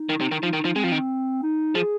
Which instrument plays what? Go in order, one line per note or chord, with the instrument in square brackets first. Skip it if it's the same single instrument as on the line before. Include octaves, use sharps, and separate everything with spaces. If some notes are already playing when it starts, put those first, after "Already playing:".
Already playing: [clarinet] D#4
[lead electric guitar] D#3
C3
D#3
[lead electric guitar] F3 [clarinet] D#4
[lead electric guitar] D#3
F3
[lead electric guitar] G#3 [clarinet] C4
[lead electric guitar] F3
D#3
[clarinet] D#4
[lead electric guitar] F3 [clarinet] G#4